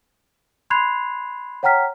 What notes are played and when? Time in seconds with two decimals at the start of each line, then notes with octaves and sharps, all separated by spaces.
0.70 B5 C6 F#6 G#6 C7 F7
1.63 C#5 F#5 G5 A#5 F6 B6